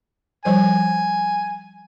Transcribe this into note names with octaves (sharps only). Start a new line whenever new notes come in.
F3 G3 C5 G#5